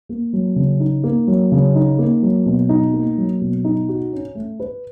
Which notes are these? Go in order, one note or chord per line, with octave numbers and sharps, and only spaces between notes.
A#3
F#3
C#3
D#4
A#3
F#3
C#3
D#4
A#3
F#3
B2
D#4
A#3
F#3
B2
D#4
F#4
C#4
A3
B4